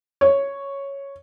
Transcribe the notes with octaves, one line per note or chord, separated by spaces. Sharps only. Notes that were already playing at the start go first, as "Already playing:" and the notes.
C#5